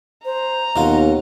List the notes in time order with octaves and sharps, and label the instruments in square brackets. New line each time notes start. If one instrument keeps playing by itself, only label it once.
[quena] C5 [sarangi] A#5
[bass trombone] D#2 [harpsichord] B2 F4 [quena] F#5